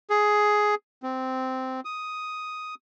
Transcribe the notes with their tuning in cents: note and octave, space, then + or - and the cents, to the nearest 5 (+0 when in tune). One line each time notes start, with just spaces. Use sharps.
G#4 +10
C4 -10
D#6 +5